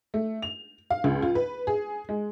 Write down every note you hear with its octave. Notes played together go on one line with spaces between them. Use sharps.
A3
F7
F5
C#2
F4
B4
G#4
G#3